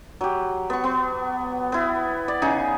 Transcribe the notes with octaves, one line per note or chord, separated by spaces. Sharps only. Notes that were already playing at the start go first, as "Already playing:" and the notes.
F#3 G4
B3 C#6
B3
B3 E4
D5
C#3 D#4 G#4